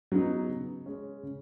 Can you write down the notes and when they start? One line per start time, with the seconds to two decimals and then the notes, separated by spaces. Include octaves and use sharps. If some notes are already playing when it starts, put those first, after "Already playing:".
0.12 F#3 B3 D#4
0.49 C#3
0.86 G#3 C#4
1.23 C#3